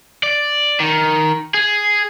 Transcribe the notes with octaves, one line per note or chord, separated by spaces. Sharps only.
D5
D#3
G#4